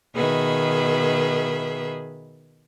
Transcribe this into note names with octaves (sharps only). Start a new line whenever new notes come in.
B2 D#3 G#4 B4 E5 B5